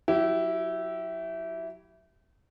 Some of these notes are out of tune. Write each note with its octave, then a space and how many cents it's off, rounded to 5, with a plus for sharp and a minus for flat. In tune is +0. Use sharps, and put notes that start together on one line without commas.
F#3 -10 E4 +0 G4 -35